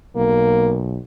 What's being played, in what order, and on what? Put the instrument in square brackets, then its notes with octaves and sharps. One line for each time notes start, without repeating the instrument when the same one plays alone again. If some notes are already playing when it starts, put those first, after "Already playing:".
[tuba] B1 [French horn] A#3